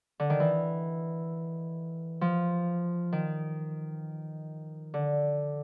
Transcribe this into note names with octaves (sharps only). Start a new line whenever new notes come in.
D3
D#3
E3
F3
D#3
D3